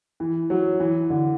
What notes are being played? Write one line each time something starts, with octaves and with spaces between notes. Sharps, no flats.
E3
F#3
E3
D3